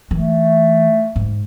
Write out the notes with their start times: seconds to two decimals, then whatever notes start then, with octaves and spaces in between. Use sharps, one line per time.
0.11 E3 A3
1.16 G#2